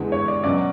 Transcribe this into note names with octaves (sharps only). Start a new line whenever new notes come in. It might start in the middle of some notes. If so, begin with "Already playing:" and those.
Already playing: E2 D3 G#3
C#5
D5
B2 F#3 C#4 D5